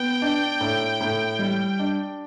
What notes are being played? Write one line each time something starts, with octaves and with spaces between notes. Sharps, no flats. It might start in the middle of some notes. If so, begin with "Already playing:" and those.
Already playing: B3 G5
D4
A2
A2
G3
D4